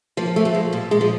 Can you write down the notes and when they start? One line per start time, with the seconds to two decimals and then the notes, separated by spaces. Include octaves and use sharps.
0.17 F3 A#3
0.36 A3
0.45 A#2
0.54 G#3
0.73 A#2 G3
0.91 G#3
1.01 F3